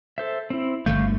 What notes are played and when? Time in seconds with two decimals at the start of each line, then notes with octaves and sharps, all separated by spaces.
0.18 A4 C5 E5
0.50 C4 E4
0.86 G1 D3 A3 F5 C#6 G6